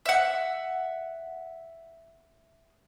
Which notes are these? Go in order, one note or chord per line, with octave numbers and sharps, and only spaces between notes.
E5 F#5